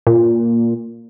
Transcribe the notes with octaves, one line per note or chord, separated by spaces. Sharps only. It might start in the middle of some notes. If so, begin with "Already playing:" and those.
A#2